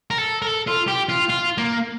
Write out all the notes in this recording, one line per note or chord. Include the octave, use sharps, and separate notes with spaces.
A#4
A4
A#4
A4
F4
G4
F4
F4
A#3